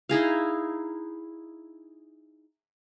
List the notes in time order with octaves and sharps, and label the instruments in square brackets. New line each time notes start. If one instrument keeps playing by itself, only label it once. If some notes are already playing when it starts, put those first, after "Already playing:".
[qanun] D#4 E4 G#4 F5